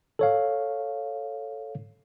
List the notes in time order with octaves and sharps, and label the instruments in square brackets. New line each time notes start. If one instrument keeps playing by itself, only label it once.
[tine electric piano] A4 C#5 F5